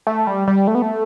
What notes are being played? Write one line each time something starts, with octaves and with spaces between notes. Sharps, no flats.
A3
G3
G3
A3
B3
A3